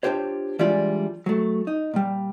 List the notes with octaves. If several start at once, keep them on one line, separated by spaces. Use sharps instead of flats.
D4 F4 G4 C5 C#5
E3 G3 G#3 D4 F4 D5
F#3 A3
D#4
A#2 G3